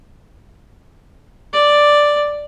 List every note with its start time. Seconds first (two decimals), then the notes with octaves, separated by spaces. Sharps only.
1.53 D5